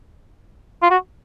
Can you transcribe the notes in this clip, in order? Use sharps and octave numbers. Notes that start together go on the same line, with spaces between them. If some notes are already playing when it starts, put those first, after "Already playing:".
F4
F#4